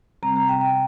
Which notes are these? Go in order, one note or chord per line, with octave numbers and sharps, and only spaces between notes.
C3 G3 C4 A#5
A#5
G5
G5